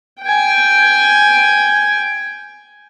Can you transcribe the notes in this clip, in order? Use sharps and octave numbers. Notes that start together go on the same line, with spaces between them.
G5 G#5